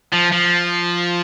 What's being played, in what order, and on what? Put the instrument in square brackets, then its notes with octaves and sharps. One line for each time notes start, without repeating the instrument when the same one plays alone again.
[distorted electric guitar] F3
F3